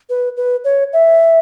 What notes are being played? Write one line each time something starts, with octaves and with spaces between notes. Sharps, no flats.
B4
B4
C#5
E5